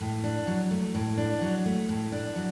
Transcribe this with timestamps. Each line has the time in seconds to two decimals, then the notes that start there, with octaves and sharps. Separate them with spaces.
0.01 A2
0.24 D4
0.47 F#3
0.71 A3
0.95 A2
1.18 D4
1.41 F#3
1.66 A3
1.89 A2
2.12 D4
2.36 F#3